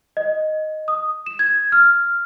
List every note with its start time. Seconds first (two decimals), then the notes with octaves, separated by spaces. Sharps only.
0.17 D#5
0.88 D#6
1.26 E7
1.39 G#6
1.72 F6